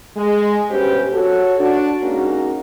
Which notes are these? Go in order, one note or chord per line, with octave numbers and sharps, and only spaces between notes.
G#3
G2 B2 C#4 G4 B4 C5
F#4 A4 C#5
D4 F#4
G#3 A#3 C#4 D#4 F#4